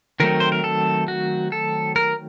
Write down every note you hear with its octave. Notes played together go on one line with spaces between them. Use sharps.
D#3 F#3 A3 C4 A#4
C5
A#4
A4
F#4
A4
A#4